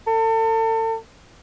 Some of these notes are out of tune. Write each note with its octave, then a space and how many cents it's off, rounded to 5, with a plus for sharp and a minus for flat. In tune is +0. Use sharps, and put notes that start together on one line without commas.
A4 +35